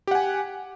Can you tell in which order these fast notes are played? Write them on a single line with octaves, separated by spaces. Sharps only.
G4 F#5 G#5